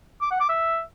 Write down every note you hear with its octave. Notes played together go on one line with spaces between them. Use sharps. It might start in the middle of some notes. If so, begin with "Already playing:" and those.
D6
F#5
D6
E5